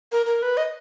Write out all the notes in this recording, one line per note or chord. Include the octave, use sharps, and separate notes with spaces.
A#4
A#4
B4
D#5